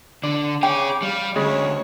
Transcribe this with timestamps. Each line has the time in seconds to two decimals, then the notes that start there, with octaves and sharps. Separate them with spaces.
0.23 D3 D5
0.63 C#4 G#4 G5 D6
1.02 G3 F5
1.36 D2 C#3 G#3 C#5